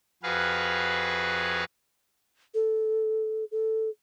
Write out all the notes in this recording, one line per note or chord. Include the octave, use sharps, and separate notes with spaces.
F2 F#4 G#4 B4 F5
A4
A4